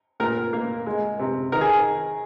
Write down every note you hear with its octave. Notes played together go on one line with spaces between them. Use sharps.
A#2 A#4
A#3
G#3
C3
D#3 A#4
G#4